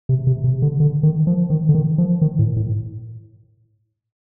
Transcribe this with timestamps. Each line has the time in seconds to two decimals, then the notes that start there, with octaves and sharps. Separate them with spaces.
0.09 C3
0.27 C3
0.44 C3
0.62 D3
0.80 D3
1.03 D#3
1.27 F3
1.50 D#3
1.69 D3
1.75 D#3
1.98 F3
2.22 D#3
2.39 A2
2.56 A2